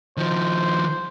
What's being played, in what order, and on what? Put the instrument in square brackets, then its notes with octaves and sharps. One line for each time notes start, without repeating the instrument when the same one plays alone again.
[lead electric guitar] D#3 F3 [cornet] C5